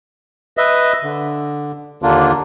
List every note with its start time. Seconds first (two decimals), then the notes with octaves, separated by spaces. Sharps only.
0.57 B4 D#5 E5
1.03 D3
2.02 D#2 D3 A#3 D4 F4